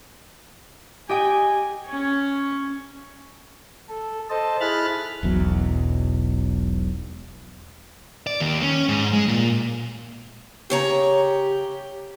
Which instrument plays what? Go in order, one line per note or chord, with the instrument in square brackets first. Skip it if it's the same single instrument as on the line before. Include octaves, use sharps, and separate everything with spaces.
[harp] G4 D#5 G5 [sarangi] G#5
[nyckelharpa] C#4 C#5
[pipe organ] A4
A4 C5 D#5 A5
E4 G#4 B5 F6 F#6 A6
[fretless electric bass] E1 B1 E2 F#3
[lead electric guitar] D5
D#2
C#4
G#2
G#3
A#2
[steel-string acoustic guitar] C#3 C#5 A#5 [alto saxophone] G4